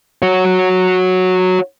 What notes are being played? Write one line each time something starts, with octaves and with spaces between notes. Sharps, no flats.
F#4 C#5